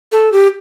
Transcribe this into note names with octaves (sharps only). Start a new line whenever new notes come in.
A4
G4